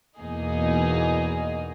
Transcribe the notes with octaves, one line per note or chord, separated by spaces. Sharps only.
E2 B2 A#3 D#4 G#4